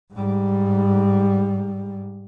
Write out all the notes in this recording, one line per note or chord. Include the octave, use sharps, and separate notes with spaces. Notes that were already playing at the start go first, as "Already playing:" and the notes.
G#2 G3